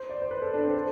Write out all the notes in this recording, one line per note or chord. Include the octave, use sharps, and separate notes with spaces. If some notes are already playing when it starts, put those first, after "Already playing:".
Already playing: C5
D5
C5
B4
A4
D4
C4
A4